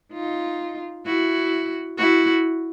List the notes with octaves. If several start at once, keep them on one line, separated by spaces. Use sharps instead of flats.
D#4 F4
E4 F#4
E4 F#4